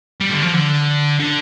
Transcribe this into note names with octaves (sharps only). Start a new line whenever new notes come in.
G3
D3
F3
D3
D3